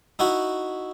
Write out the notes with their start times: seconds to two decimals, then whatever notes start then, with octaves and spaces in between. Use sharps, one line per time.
0.19 D#4 E4 F#4 F#5